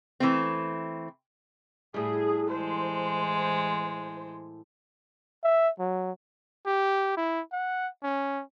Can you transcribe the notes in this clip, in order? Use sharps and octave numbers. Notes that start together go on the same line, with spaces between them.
E3 A3 C4
A2 G3 G#4
E3 G#3 C5
E5
F#3
G4
E4
F#5
C#4